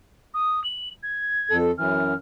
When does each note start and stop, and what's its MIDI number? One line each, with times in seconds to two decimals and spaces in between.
0.34 0.63 87
0.64 0.89 102
1.03 1.56 92
1.51 1.71 41
1.51 1.71 69
1.78 2.14 42
1.78 2.14 52
1.78 2.15 89